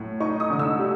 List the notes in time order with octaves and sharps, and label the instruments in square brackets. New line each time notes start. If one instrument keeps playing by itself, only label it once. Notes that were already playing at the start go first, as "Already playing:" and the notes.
Already playing: [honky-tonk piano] A2 F#3
D#4 C#6
D#6
D3 D#6
E6
G3